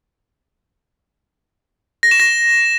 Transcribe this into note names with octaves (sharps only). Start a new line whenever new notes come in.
A#6
E7
A#6